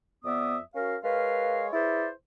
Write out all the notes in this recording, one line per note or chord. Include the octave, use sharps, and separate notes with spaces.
F2 B3 D5 E5 D#6
C#4 F#4 A#4 F5
G#3 A#4 B4 C#5 F5
E4 G#4 B4 C5 D5 E5